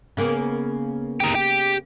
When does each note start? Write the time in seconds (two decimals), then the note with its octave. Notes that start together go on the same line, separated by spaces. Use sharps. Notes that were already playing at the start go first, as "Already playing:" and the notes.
0.17 C#3 A#3 B3
1.20 G4 A#4
1.35 G4